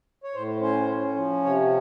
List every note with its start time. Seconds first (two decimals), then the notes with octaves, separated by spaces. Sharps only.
0.24 C#5
0.35 A2 C5
0.61 C#4 C5
0.89 C#4
1.16 F3
1.44 C3 C#5